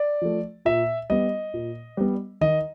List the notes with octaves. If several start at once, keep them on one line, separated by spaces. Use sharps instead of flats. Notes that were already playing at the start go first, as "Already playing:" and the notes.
Already playing: D5
F3 A3
A#2 E5
G3 B3 D#5
A#2
G3 B3
D#3 D#5